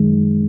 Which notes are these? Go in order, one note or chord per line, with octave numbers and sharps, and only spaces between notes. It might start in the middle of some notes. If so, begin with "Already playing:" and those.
Already playing: F#2 D#3 G#3